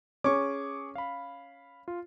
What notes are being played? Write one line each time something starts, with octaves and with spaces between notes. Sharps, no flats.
C#4 G#4 C#6 D6
F5 B5
F4